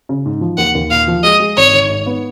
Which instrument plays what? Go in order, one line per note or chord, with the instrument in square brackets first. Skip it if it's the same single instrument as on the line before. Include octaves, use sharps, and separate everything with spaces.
[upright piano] C#3
G#2
F3
[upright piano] D#2 [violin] F#5
[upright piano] D#2
[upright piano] A#2 [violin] F5
[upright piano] F3
[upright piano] G#3 [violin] D#5
[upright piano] G#3
[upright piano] G#1 [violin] C#5
[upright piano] D#3
G#2
B3